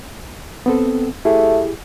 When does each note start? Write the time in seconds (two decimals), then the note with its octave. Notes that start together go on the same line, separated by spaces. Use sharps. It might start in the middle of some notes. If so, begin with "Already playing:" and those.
0.66 B3 C4 A4
1.25 A3 E4 G4 G#4